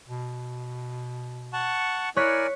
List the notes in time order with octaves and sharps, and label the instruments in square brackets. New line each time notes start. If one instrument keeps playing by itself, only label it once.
[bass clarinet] B2
[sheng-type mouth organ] F#5 A5 C#6
[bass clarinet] E4 [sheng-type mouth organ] A#4 D5 G#5 [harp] C#5 F#6 B6